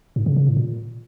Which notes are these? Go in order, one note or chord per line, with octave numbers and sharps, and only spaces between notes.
G#2
C#3
C#3
A2
A#2